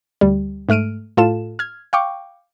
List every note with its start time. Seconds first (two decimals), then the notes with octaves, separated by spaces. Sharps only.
0.21 D2 G3
0.69 G#2 A3 F6 D7 D#7
1.17 A2 F4 A4 E7
1.59 F6 G#6
1.93 F5 G5 C#6 D6